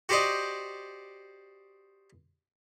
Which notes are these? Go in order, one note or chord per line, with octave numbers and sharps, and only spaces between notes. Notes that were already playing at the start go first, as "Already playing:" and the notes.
F#4 G4 C5 D5 D#5